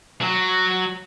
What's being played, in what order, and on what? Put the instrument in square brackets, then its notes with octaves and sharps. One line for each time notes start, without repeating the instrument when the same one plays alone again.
[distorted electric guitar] F#3